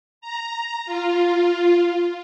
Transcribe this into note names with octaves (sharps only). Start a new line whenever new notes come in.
A#5
F4